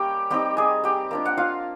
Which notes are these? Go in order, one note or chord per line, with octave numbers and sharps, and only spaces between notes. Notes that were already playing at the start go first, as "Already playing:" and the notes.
Already playing: G3 A#3 C#4 G4 G5
G3 C4 D#4 G4 G5
G#4 G#5
G4 G5
A#3 D4 F4
F#5
F4 F5